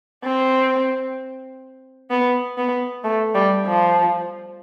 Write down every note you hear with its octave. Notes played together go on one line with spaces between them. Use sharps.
C4
B3
B3
A3
G3
F3